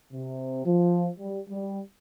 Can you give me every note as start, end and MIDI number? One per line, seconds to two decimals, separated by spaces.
0.12 0.65 48
0.65 1.08 53
1.19 1.40 55
1.48 1.81 55